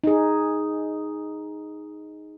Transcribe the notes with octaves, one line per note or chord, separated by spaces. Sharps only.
D#4 G#4